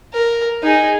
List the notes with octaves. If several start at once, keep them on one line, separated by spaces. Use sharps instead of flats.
A#4
D#4 G#4